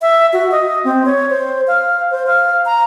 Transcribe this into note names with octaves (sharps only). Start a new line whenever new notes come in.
E5
F#4
D#5
C4
C#5
C5
F5
C5
F5
A#5